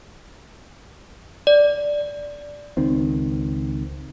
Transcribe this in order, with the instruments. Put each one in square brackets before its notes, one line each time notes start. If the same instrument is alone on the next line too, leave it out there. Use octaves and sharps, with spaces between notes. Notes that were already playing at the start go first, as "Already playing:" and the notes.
[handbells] D5
[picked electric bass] C#2 D#3 C4